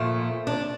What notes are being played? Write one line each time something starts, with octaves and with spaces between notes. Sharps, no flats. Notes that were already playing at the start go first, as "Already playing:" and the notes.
Already playing: A#2 F3 A3
D4